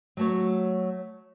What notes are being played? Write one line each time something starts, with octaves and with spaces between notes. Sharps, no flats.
F#3 A3 C#5